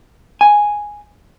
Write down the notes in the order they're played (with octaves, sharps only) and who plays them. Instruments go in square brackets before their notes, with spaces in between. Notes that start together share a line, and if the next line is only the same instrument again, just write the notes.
[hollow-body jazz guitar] G#5